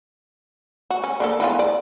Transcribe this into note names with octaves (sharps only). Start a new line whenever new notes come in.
F#4
C#4
D3 A#3 A4
E3 B3 F4
D5